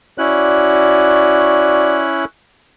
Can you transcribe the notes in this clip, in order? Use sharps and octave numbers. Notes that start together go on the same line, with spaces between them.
C#4 E4 F#4 D5 F#6